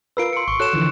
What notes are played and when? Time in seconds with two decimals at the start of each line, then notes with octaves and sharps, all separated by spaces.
0.17 F4 A#4 B4 E6 C7 D7
0.33 C6 C#7
0.48 G#1 C#6
0.60 F#4 A4 C#5 F#6 E7
0.73 D3 E3 F3